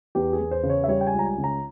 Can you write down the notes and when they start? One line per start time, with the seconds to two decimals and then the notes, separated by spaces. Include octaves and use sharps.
0.15 E2 G4
0.33 G#4
0.40 E2
0.51 C5
0.63 C#3
0.70 C#5
0.84 E5
0.88 G3 C#5
1.01 G5
1.07 G#5
1.13 C#2
1.19 A#5
1.25 G#5
1.38 C#3
1.44 A#5